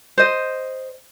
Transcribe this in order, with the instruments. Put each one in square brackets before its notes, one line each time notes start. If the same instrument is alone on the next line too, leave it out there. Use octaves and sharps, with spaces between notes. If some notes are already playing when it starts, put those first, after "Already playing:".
[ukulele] C5 D#5